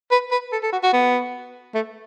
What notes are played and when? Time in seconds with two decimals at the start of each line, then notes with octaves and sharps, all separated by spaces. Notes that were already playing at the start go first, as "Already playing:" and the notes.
0.11 B4
0.31 B4
0.52 A4
0.63 A4
0.72 F#4
0.83 F#4
0.93 B3
1.74 A3